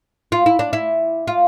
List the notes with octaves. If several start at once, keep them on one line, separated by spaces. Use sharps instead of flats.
F4
E4
D4
E4
F4